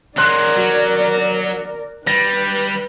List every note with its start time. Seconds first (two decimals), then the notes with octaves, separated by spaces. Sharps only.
0.18 F#3 G#3 A#4 D5 C6 F#6
0.57 F#3 F#4
2.07 G3 B4 A#6